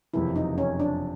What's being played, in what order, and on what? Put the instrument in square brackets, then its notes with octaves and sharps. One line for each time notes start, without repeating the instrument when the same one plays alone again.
[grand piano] F#1 F2 C3 E3 [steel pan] E4
[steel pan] D#4
C#4
D4